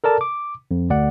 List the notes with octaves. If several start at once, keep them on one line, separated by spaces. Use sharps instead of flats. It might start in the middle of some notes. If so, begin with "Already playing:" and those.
A4 A#4 D5 A5
D6
F2
D2 D5 F#5